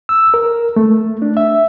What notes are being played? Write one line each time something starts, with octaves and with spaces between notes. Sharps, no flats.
E6
A#4
A3
D4
E5